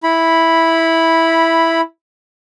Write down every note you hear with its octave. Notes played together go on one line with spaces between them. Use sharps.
E4 B5